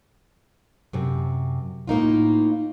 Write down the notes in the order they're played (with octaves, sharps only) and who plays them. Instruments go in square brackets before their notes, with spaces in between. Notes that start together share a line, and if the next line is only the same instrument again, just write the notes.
[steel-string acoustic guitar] F#2 C3
A2 A#3 D#4 F4